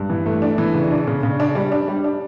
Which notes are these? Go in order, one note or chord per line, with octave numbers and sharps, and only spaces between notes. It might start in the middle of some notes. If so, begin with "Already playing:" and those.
Already playing: G2
E3
A3
D4
E3
C#3
D4
C#3
C#3
D4
G3
D4
G3
D4